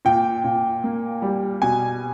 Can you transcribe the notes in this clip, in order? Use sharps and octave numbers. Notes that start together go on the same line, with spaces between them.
A#2 G5
A#2
A#3
G3
B2 G#5